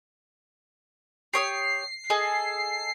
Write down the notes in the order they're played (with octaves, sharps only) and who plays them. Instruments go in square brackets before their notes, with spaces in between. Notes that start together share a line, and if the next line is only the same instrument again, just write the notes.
[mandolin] G4 C#5 D#6 [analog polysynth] C7
[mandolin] G#4 A4 D#5